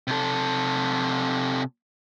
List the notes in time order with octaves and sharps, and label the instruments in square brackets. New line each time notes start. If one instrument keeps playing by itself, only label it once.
[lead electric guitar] C3 A4